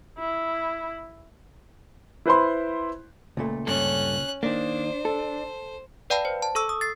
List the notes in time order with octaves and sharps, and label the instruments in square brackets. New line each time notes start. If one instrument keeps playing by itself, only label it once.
[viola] E4
[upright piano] E4 B4 C5 B5 C6
[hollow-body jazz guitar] C#2 A#2 A3
[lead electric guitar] G2 A4 [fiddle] C#4 F#6
[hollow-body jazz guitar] D#3 A#3 [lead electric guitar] D4 [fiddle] C5
[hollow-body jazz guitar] A4
[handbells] B4 D5 F5 G5 A5 B5
C5
A5
A4 C#6 E6
D#6
A6 C7